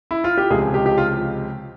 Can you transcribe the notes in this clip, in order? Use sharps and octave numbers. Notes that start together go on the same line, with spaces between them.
E4
F4
G4
C#2 C3 F3 G#3 G#4
G4
G4
F4